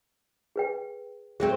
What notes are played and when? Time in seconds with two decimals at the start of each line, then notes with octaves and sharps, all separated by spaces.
0.56 G#4 B4 G5
1.40 F#3 A3 C4 G#4